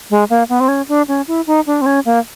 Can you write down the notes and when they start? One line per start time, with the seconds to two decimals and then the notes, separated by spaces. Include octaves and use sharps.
0.10 G#3
0.30 A#3
0.49 B3
0.60 C4
0.68 C#4
0.89 D4
1.08 C#4
1.28 E4
1.47 D#4
1.67 D4
1.81 C4
1.86 C#4
2.05 A#3